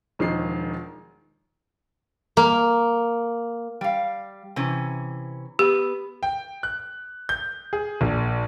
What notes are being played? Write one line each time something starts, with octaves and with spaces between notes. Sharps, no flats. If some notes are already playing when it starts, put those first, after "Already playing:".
E1 D#3 F3 D#4 C7
A#3
G3 F5
C3 E3 C#4
B3 G4
G5
F#6
G6
G#4
A#1